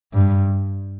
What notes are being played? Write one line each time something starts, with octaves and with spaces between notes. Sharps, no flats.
G2